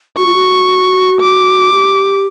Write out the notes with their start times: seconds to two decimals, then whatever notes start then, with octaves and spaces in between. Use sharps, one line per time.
0.17 F#4 C#6
0.26 F4
0.34 F#4
1.21 D6
1.72 G4